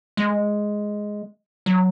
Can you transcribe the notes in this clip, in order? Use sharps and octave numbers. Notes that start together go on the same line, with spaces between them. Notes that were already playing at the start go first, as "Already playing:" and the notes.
G#3
F#3